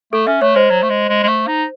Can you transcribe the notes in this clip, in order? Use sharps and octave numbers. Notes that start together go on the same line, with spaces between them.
A3 A4
C#4 E5
A3 C#5
G#3 C5
F#3
A3
G#3
G#3
G#3
A3
D#4